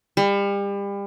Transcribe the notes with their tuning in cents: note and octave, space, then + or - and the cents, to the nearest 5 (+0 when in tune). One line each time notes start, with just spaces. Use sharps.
G3 +35